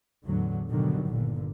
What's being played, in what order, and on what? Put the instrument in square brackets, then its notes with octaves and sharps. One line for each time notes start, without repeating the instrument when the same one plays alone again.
[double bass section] E2 A2 D3 F#3
G#2 B2 D3 D#3 F#3 G3
G1 A#2 D3